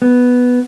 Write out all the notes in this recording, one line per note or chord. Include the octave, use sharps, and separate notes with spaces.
B3